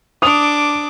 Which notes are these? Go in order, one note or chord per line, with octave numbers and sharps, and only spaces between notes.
D4 D6 D#6 F7